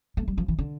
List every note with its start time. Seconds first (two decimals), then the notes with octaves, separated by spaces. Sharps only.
0.17 A3
0.28 G3
0.38 F3
0.48 E3
0.59 D3